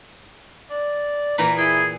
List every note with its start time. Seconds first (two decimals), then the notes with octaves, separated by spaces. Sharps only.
0.70 D5
1.38 A#2 E3 A#5 B5
1.58 E4 G#4 G5